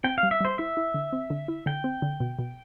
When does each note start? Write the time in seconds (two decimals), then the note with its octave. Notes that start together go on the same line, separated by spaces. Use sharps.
0.04 C4 G5
0.18 F5
0.23 G3
0.31 E5
0.41 G3 C5
0.58 E4 E5
0.77 E4
0.94 D3
1.13 C4
1.30 D3
1.48 E4
1.66 D3 G5
1.84 C4
2.02 D3
2.20 B2
2.39 B2